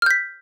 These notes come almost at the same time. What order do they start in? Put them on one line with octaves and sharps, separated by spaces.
F6 G6 B6